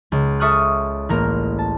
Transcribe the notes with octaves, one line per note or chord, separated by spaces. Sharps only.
C#2
A4 E5 C#6 D#6 F6 F#6
A1 A#3 A#4
A5